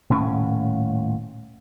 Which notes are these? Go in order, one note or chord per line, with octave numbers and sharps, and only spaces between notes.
D#1 A2 C#4